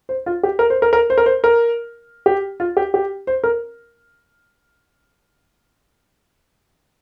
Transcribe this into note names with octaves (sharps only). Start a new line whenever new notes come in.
C5
F4
G4
A#4
C5
A#4
A#4
C5
A#4
C5
A#4
G4
F4
G4
G4
C5
A#4